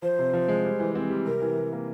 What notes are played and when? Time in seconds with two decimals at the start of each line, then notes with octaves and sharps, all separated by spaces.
0.02 F3 C5
0.19 C3
0.33 F3
0.48 G#3
0.64 G3
0.80 E3
0.95 C4
1.10 G3
1.26 C3 A#4
1.42 E3
1.57 G3
1.72 A#3